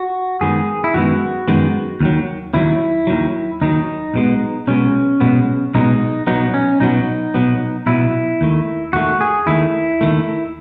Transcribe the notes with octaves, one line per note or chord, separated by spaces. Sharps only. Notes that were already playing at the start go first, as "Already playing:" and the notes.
Already playing: F#4
F#2 D#3 G#3 B3 G#4
E4
F#2 D#3 G#3 B3 F#4
F#2 D#3 G#3 B3
D#2 D#3 F#3
D#2 D#3 F#3 E4
D#2 D#3 F#3
D#2 D#3 F#3 D#4
B1 B2 G#3 B3
B1 B2 G#3 B3 C#4
B1 B2 G#3 B3
B1 B2 G#3 B3 D#4
B1 B2 F#3 B3 D#4
C#4
B1 B2 F#3 B3 D#4
B1 B2 F#3 B3
B1 B2 F#3 B3 E4
D#2 D#3 A3
D#2 D#3 A3 F#4
G#4
D#2 D#3 A3 E4
D#2 D#3 A3